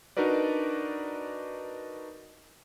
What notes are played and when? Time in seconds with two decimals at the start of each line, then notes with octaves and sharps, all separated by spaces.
0.17 D4 D#4 F#4 A#4 B4 D5